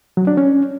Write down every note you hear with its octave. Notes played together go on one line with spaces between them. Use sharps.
F#3
D4
C#4